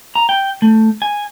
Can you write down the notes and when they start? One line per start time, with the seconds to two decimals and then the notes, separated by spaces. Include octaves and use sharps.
0.15 A#5
0.29 G5
0.62 A3
1.02 G#5